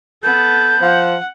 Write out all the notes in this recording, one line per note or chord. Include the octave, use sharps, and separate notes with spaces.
B3 A4 G6
F3 F#5